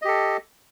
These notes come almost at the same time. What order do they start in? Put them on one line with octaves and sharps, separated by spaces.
D#5 G4 A4